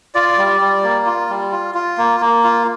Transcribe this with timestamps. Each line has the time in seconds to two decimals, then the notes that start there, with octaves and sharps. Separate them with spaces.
0.15 F4 D5
0.38 G3
0.61 G3
0.83 A#3
1.06 F4
1.29 G3
1.52 F4
1.75 F4
1.98 A#3
2.20 A#3
2.44 F4